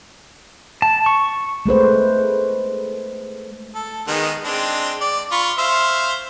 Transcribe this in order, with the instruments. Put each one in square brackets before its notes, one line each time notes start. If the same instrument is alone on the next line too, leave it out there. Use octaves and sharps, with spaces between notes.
[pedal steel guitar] A5
C#6
[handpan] G#3 A3 B4 C5
[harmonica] A4
D#3 G#3 B3
G#3 C4 D4
D5
F4 B5 C#6
C5 E5 F5